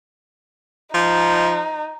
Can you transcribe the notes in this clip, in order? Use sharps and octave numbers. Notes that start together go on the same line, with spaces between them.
F3 D#4